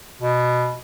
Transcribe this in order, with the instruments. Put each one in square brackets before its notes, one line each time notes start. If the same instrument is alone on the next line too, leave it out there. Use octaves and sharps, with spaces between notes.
[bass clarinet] B2